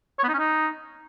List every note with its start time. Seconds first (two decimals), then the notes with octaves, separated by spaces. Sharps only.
0.19 C#5
0.24 B3
0.29 D#4
0.34 C#4
0.39 D#4